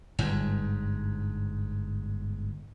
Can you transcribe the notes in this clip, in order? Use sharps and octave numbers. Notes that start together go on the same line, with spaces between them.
G1 G#2